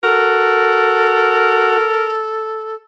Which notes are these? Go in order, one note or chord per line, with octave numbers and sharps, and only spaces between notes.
F#4 A4 A#4